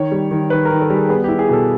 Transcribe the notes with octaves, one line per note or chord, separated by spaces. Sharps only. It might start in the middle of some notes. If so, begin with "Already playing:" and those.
Already playing: D#3 C#5
G3
D#3
D#3 B4
A#4
D#3
A4
G3 G#4
B3 G#4
G4
E4
G#4
B2 A4